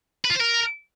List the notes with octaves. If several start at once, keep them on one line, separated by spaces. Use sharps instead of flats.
B4
F4
C5
A#4